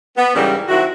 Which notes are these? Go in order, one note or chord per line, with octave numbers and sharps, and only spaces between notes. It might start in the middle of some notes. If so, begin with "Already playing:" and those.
B3
G#2 C#3 E3 G3 A#3 G4
D#3 F#3 C4 E4 F#4